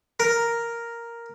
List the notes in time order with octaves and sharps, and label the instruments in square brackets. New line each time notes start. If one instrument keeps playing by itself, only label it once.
[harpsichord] A#4